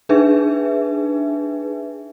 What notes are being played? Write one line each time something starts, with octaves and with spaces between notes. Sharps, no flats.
D4 D#4 G#4 B4 E5